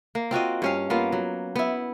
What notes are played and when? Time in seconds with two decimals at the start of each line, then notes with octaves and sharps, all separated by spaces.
0.15 A#3
0.31 C4 F4 F#4 D#5
0.62 G2 C#4 F5
0.90 A#3 B3 F4
1.12 F#3
1.56 B3 E4